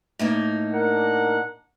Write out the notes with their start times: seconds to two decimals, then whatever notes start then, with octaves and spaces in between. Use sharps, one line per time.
0.19 A2 A#3 D#4
0.73 D4 A#4 F#5